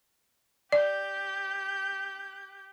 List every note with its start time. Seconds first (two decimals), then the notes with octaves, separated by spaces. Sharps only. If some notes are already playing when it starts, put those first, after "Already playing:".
0.72 G4 D5 G6